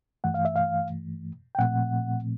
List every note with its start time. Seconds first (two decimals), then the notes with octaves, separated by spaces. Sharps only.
0.24 G2 E3 A3 F#5
0.34 F5
0.45 E5
0.56 F5
1.55 G5
1.59 A#2 F3 A3 C4 F#5